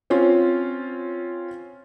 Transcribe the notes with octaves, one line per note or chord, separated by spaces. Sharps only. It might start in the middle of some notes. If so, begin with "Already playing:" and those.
C4 C#4 F4